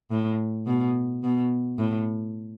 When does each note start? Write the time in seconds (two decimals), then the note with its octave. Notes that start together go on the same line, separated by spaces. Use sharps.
0.11 A2
0.67 B2
1.23 B2
1.79 A2